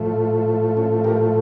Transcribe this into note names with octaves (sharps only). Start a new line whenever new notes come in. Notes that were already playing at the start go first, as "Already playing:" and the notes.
Already playing: A2 F3 A3
C#4
G4 A#4